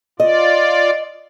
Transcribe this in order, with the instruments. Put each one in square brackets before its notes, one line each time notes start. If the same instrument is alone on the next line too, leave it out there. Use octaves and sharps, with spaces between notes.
[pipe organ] F4 D5 [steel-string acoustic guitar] D#5